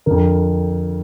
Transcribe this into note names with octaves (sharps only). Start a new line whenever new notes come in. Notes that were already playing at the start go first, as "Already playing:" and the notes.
F2 D3 A#4